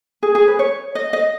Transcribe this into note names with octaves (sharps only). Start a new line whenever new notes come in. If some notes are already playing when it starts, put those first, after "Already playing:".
G#4
G#4
B4
C#5
D#5
D#5